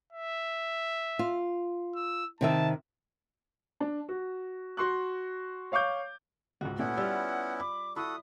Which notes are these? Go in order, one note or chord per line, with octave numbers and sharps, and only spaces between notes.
E5
F4
E6
C3 D#3 E5 A5
D4
F#4
F#4 C6 C#6 F#6
C#5 F5 C#6 D6 G6
C#2 G#2 F#4
A#2 A3 B3 C#4 E4 F#5
G3 F4 E6
B5 D6
E4 F#4 A4 B5 D#6